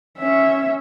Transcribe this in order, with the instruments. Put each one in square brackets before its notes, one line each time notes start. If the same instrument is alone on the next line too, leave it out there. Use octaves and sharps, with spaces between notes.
[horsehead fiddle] C#4 E5